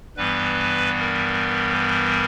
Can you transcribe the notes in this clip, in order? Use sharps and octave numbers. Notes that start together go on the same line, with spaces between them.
G2 E3 G3 B3 B4
A#4
A#4